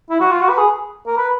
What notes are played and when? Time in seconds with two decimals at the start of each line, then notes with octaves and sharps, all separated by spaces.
0.10 E4
0.21 F#4
0.31 F4
0.42 F#4
0.50 B4
0.58 G#4
1.07 A#4
1.17 B4